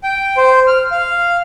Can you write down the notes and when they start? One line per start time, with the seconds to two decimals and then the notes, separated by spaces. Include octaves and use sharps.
0.03 G5
0.37 C5
0.67 F6
0.91 F5